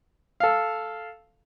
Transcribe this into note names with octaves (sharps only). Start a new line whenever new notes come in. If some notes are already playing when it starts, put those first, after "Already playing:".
A4 F5